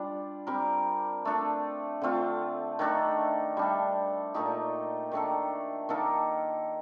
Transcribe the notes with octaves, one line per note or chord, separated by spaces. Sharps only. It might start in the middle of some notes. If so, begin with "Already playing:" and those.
Already playing: G3 D4 F4
G3 C4 G4 A#4
A3 D4 A4
D3 A3 C4 F4
D#3 A3 D4 A4
G3 D4 A4
A#2 A3 D#4 G4
D#3 A3 D4 A4
D#3 A#3 D#4 A4